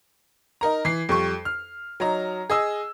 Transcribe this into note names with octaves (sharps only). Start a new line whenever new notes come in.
D#4 A#4 A#5
E3 C7
F2 G3 C#6
F6
F#3 D#4 A#5
G#4 D#5 E6